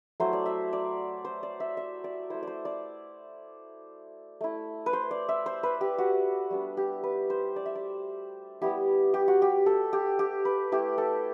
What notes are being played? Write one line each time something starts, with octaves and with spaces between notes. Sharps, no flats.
F#3 A3 E4 C5
D5
E5
D5
C5
D5
E5
E5
D5
A3 E4 C5
C5 D5
D5
A3 E4
B4
C5
D5
E5
C5
B4
G4
F#4
G3 B3 D4
G4
B4
C5
D5
E5
D5
G3 B3 E4 G4
G4
F#4
G4
A4
G4
G4
B4
A3 E4 G4
A4